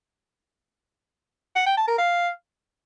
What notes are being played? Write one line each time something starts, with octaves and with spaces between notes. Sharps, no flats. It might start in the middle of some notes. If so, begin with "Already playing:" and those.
F#5
G5
A5
A#4
F5